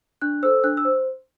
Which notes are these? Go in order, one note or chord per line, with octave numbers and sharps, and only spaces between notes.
D4 F#6
A4 C5 E6
D4 F#6
E6
C5